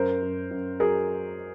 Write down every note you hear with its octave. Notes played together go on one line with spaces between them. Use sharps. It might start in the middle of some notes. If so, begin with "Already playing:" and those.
Already playing: F#2 A#4 C5
F#2
F#2
F#3 G#4 A#4